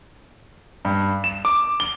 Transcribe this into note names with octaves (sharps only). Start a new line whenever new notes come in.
G2
E7
D6
G7